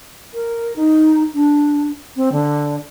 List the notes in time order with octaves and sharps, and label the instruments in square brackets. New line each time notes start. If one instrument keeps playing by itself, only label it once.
[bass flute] A#4
D#4
D4
C4
D3